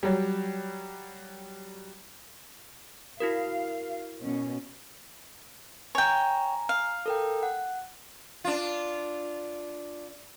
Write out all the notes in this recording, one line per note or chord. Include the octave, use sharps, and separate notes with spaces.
F#3 G3
E4 F#4 A#4 F5
B2 C#4
C#5 G5 G#5 A#5
F5
A4 A#4 G5
F#5
D4 F4